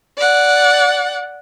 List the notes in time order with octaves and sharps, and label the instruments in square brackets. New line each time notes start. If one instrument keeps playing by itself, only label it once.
[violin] D5 F#5